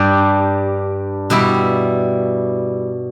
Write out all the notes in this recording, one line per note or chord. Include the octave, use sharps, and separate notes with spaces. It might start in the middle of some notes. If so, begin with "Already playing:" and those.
Already playing: G2 G3 D4 G4
B2 G3 E4